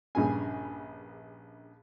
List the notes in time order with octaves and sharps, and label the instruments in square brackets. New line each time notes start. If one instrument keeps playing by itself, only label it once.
[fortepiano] A#1 G2 C#3 G#4 G#5